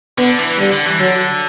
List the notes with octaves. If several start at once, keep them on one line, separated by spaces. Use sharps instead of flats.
D3 B3
E3
D3 G3
D3
E3
D3 F#3